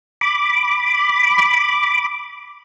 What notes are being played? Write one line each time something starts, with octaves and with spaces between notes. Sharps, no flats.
B5 D6